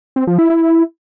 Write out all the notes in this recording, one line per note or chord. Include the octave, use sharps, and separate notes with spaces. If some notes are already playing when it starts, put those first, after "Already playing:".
C4
F3
E4
E4